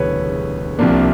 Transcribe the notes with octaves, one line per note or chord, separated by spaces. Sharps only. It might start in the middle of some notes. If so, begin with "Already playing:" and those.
Already playing: E1 D2 C#3 E3 G3 B4 C#5
C2 C3 F3 A#3 D4